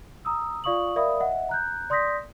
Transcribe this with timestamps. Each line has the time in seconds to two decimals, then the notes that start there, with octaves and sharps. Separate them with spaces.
0.25 A#5 D#6 E6
0.64 F4 D5 F5 C#6 D#6 F#7
0.96 A#4 D5 E5 F5 B5 D#6
1.20 D#5 E5 F#5
1.49 A#5 F#6 G6
1.90 D5 C6 D#6 G6 A#6 B6